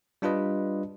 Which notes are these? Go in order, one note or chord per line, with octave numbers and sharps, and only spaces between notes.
G3 D4 F4 B4 D#5